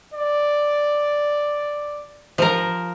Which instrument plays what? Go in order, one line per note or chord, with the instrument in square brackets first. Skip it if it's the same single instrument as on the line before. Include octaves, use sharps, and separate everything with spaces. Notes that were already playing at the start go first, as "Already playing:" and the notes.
[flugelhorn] D5
[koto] F3 A#4